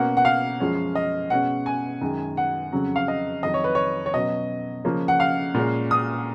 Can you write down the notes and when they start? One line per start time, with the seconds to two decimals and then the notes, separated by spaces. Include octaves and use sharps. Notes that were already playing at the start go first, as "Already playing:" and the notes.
Already playing: B2 A#3 C#4 F#5
0.17 F#5
0.25 F5
0.60 F#2 F3 G#3 C#4
0.95 D#5
1.30 B2 G#3 C#4 F#5
1.66 G#5
2.01 F#2 D#3 G#3
2.37 F#5
2.73 F2 C#3 F#3 C#4
2.96 F5
3.08 D#5
3.43 F2 D#3 F#3 D#5
3.54 C#5
3.64 B4
3.75 C#5
4.06 C#5
4.14 B2 F#3 C#4 D#5
4.84 C#3 F3 A#3 C#4
5.08 F#5
5.20 F5
5.55 A#2 G#3 C#4
5.91 D#6